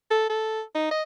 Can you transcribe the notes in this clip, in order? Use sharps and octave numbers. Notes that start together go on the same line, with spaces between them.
A4
A4
D#4
D#5